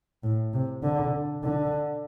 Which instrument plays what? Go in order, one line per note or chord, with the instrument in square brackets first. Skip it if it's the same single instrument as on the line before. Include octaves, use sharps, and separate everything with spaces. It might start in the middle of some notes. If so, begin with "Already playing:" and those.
[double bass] A2
C3
D3
D3